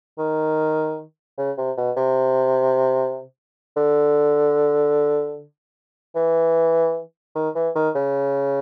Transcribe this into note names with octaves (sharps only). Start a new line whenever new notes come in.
D#3
C#3
C3
B2
C3
D3
E3
D#3
E3
D#3
C#3